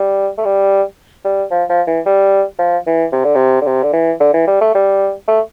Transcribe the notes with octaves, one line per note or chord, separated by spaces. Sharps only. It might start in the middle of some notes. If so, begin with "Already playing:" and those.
Already playing: G3
A3
G3
G3
F3
F3
E3
G3
F3
E3
C3
D3
C3
D3
C3
D3
E3
D3
E3
G3
A3
G3
A3